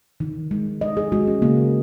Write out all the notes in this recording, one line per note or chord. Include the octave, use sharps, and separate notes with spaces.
D#3
G#3
D#3 D#5
G#4
G#3 F#4
C#4
C#3 A#3